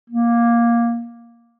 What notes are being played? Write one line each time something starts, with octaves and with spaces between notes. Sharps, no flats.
A#3